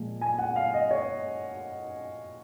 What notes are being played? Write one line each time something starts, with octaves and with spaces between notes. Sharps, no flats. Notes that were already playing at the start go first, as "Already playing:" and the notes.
Already playing: A#2 F3 G#3
G#5
F#5
F5
D#5
C#5